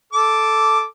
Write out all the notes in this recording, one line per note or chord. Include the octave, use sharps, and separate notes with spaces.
A4 D6